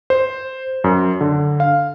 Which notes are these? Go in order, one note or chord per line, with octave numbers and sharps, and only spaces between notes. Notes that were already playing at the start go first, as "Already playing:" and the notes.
C5
F#2
D3
F5